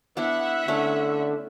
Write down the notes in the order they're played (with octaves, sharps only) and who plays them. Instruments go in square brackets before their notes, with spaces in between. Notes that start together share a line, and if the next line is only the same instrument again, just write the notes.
[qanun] B3 D4 E4 [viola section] E5 F#5
[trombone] D3 [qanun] A3 C#4